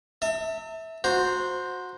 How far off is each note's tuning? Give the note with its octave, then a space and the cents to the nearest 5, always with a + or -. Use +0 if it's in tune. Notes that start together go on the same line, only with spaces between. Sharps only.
E5 -20 A5 +40
F#4 -20 C5 +0 A#5 +0